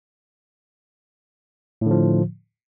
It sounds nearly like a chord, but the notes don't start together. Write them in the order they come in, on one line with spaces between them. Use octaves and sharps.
A2 D3 F3